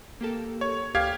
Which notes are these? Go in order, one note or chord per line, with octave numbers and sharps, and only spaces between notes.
A#3 G4 A4
C#5
D2 G4 F5 G#6